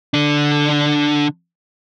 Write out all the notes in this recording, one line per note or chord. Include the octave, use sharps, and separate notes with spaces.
D3 D4